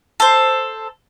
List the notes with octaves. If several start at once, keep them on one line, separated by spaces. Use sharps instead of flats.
A4 C5